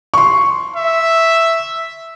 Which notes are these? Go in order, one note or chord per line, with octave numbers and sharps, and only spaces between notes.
C6 C#6
E5